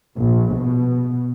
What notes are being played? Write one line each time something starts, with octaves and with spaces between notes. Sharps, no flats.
A#1
B2